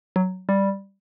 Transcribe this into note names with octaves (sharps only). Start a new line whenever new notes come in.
F#3
G3